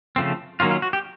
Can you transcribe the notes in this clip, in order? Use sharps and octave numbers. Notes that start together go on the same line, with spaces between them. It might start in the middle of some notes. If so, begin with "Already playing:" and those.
C#3 F3 A3 C4
D#3 F#3 A#3 C#4 F4
F4
F#4
G4